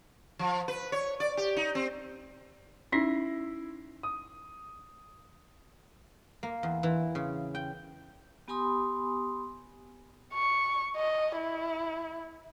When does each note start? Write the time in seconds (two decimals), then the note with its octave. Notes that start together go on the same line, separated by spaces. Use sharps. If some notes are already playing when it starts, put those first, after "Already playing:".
0.39 F3
0.68 B4
0.92 C#5
1.20 D5
1.37 G4
1.57 D#4
1.75 C4
2.92 C#4 D#4 E4 A#6 C7
4.03 D#6
6.43 A#3
6.63 E2
6.83 E3
7.15 C#3
7.55 G5
8.48 B3 G4 G#5 B5 C6 D#6
10.34 C#6
10.97 D#5
11.37 E4